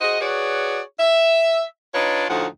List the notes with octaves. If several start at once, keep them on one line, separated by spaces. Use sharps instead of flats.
F#4 G#4 C5 D#5
F#4 G#4 B4 C#5 D5
E5
D4 D#4 F4 B4 C#5
D2 A2 F3 D#4 F#5